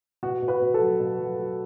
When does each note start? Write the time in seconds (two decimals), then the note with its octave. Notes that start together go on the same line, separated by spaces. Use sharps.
0.23 B2 F#4
0.42 B2
0.48 F#4 B4
0.61 B2
0.74 A4
0.81 F#3
1.00 B2
1.20 F#3
1.39 F#3